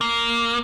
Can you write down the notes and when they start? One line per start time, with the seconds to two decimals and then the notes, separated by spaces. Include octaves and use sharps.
0.01 A#3